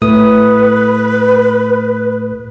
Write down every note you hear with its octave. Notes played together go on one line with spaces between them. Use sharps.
A2 A3 B4 D#6